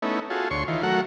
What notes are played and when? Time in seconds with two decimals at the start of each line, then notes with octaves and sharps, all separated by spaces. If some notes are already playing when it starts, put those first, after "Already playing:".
0.02 A3 B3 C#4 D#4 E4
0.30 F4 F#4 G#4 A4
0.51 D2 C#5 C6 C#6
0.68 D#3 E3 F4
0.83 F#3 A3 F#4 A#4 F#5